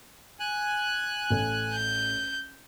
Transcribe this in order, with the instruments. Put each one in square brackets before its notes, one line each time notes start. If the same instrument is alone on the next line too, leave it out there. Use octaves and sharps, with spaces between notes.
[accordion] G#5 F#6
[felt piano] A1 A4
[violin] G6